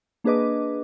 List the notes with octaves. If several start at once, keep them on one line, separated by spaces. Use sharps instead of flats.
A#3 D4 G#4 B4 D#5 D6